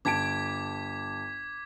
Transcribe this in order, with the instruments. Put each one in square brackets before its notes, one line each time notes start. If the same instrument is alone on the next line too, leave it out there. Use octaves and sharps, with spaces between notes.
[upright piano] G1 A5 D7 [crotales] D6 G#6 B6